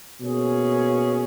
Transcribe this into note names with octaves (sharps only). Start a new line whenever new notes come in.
B2 A#3 C#4 G#4